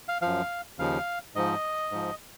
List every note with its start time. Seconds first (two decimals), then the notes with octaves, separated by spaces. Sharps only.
0.08 F5
0.22 F#2 F3 F5
0.79 D#2 C#3 F3 F5
1.35 G#2 F3 D#5
1.91 G#2 F3